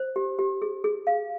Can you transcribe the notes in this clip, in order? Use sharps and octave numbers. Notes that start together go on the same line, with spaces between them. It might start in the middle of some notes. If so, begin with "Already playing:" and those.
Already playing: C5
G4
G4
G#4
G#4
F5